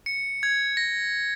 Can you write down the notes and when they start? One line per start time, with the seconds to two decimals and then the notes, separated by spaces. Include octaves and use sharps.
0.06 C#7
0.43 G#6
0.77 A#6